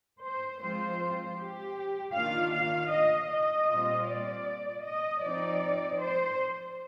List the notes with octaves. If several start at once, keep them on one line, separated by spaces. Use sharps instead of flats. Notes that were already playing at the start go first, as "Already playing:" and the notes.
C5
F3 G#3 C4 F4 C5
G4
D#3 A#3 D4 F4 F5
F5
D#5
D#5
A#2 G3 C4 F4
D5
D#5
F3 C4 D#4 D5
C5